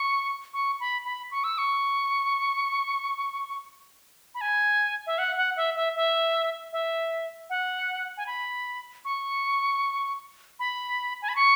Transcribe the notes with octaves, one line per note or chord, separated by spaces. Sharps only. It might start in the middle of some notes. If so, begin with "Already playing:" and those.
Already playing: C#6
C#6
B5
B5
C#6
E6
C#6
B5
G#5
E5
F#5
F#5
E5
E5
E5
E5
F#5
G#5
B5
C#6
B5
G#5
B5
C#6